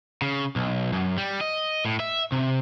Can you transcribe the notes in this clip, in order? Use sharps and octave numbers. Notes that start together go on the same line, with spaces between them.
C#3
B1
F#2
G3
D#5
A2
E5
C3